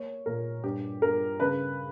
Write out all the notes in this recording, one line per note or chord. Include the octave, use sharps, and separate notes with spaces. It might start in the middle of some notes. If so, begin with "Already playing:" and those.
Already playing: A#3 C#5
A#2 A#4
G2 G4
G2 A#4
C#3 B4